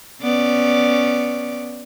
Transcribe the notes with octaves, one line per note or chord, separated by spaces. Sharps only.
B3 C#4 D5